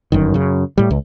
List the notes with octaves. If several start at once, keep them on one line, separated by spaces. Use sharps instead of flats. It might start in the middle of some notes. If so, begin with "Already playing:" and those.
G1 F#2 D#3
F#2 C#3
A2 G3
C#2